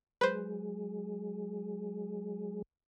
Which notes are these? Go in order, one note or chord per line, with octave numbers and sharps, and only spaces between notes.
F#3 G#3 G#4 B4 C5